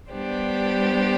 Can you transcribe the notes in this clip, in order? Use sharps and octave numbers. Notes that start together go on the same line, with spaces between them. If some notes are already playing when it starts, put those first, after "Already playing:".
G3 B3 D4 G4 C5